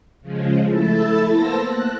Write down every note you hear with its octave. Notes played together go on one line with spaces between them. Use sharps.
C#3 F3 G#3
A3 E4 A4 A5
A#3 B3 C5 A5 E6 A#6
F#6